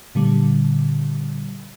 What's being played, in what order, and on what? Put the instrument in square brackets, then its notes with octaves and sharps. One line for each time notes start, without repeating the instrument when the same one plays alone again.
[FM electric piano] A#2 D3 G3